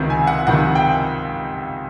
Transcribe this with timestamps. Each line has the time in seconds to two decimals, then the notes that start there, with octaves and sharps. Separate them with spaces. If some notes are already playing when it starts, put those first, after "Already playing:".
Already playing: C#2 C3 D#3
0.10 G#5
0.27 F#5
0.47 C#2 C3 D#3 F#5
0.75 G5